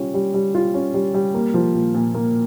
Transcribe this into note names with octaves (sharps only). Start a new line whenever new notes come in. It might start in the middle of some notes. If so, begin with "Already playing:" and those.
Already playing: G3 C#4 F4
G3
G3
F4
C#4
G3
G3
A#3
F3
A#2
A#2
A#3